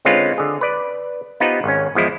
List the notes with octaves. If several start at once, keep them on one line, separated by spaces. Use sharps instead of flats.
D3 G#3 C4 C#4 F4 B4
D3 G#4
B4 D5
B3 D#4 F4 G4 B4 C5
G#1 C#4
E2 F3 G#3 E4